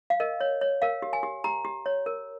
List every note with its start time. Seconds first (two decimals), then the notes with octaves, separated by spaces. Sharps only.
0.10 F5
0.20 A#4 D#5
0.41 C#5
0.61 C#5
0.82 A#4 F5
1.02 G4
1.13 G#5
1.23 G4
1.44 G4 A#5
1.65 G4
1.86 C#5
2.06 A#4